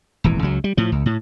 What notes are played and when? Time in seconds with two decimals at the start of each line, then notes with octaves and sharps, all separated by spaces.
0.24 D#1 G#1 E3
0.42 C#2 F#3
0.64 G3
0.77 A2 F3
0.92 C#2
1.06 A2